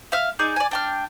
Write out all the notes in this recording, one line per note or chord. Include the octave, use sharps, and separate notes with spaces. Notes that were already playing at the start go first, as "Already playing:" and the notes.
E5 F5 F6
D#4 G#4 D5
D5 G#5
D4 G5 F6